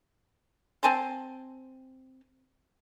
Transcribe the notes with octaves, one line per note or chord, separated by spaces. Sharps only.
C4 G#5 A5 C6